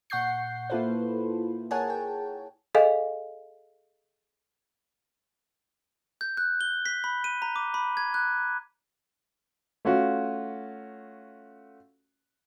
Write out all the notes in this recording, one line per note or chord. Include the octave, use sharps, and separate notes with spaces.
A#2 F#5 C#6 G6 C7
A#3 E4 F4 A4 B4 C5
G#4 A#4 C#5 F#5 G#5 A5
G5
G#4 A4 D#5 F5 G#5
G6
F#6
G7
B6
B5
D#7
A#5
D6
B5
G#6
F#6
A3 C#4 F4 F#4